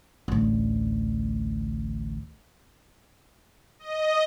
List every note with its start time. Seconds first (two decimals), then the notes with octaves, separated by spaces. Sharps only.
0.28 A1 D2
3.79 D#5